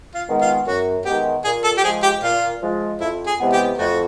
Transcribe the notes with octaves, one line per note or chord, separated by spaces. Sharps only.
F4
D#3 G#3 B3
F4
F#2 F#4
D#3 G#3 B3 G4
A#2 G#4
A4
G4
F3 G#3 G#4
G4
A#2 F4
F3 G#3
F2 E4
G#4
C3 E3 G#3 B3
G4
F2 A3 F#4